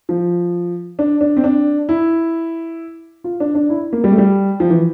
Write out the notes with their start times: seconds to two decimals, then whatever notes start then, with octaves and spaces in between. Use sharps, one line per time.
0.09 F3
0.99 D4
1.21 D4
1.37 C4
1.44 D4
1.89 E4
3.24 F4
3.40 D4
3.55 D4
3.70 E4
3.93 A#3
4.04 G3
4.11 A3
4.18 G3
4.60 F3
4.70 E3